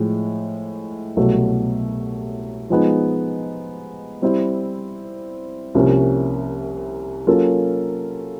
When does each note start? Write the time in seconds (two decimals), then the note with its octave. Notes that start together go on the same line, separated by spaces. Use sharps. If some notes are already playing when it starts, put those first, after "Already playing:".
Already playing: A2 F3 G#3
1.16 C2 B2 F#3 A3
2.70 F3 G#3 B3 D#4
4.22 G3 C4 E4
5.75 C2 C3 F3 A#3 C#4
7.27 F#3 A#3 C#4 F4 A4